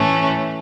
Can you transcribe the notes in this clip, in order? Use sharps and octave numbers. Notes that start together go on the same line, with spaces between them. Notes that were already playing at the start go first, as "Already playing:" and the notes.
Already playing: A2 E3 A3 C#4